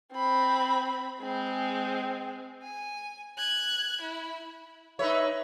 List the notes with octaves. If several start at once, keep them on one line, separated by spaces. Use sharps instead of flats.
C4 B5
G#3 C4
G#5
F#6 G#6
E4
D#4 B4 C#5 E5